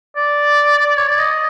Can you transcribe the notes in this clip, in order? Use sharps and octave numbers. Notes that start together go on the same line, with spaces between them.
D5
C#5
D5
D#5